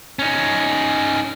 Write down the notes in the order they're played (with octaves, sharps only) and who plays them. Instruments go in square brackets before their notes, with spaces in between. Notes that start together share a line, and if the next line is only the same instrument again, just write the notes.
[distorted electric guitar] C#4 D#4